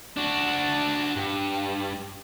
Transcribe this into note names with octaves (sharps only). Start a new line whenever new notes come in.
D4 F#4
G2